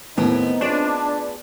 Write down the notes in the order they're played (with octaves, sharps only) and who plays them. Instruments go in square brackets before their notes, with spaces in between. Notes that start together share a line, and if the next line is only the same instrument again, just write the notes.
[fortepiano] D#2 A2 [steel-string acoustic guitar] A3 B3 A#4 [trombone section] C4 D#4
[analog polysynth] D4 [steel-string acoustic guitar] F4 G#4 B4 [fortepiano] C#5